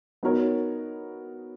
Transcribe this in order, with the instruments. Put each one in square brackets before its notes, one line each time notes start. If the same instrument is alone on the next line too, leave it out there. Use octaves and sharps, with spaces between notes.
[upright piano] B3 D#4 F#4 A#4 C#5